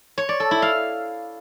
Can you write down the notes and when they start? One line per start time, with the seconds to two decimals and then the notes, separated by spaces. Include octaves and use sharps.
0.18 C#5
0.29 D5
0.40 A4
0.51 E4
0.62 F5